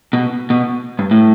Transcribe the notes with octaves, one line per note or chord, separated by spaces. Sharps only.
B2
B2
G2
A2